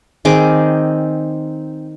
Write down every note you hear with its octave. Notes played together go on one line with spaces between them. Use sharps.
D#3 C4 G#4 D6